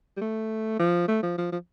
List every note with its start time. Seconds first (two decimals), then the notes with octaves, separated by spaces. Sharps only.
0.17 G3
0.21 A3
0.79 F3
1.08 A3
1.23 F3
1.38 F3
1.52 F3